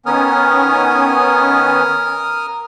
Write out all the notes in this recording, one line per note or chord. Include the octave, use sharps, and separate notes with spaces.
D#3 B3 C#4 A#4 D#6 F6